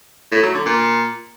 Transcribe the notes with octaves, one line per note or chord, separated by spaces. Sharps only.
A2
F#3
D3
A#2